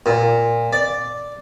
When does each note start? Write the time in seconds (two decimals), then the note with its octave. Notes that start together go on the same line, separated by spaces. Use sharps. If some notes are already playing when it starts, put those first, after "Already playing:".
0.06 A#2
0.73 D5